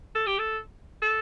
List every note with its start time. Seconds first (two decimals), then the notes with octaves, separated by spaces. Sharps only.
0.15 A4
0.27 G4
0.39 A4
1.02 A4